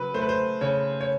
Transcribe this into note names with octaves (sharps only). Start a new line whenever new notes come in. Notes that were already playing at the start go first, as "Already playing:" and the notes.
Already playing: C#3 F#3 B4
A3 C5
B4
C5
C#3 C#5
C#5